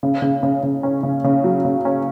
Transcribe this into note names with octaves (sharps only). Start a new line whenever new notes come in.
C#3
C#3
C#3
C#3
C#4
C#3
C#3
F#3
C#3
C#4